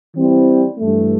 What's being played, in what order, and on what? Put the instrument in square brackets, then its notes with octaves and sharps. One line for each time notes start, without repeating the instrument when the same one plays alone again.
[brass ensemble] E3 G3 C4 E4
G2 E3 A3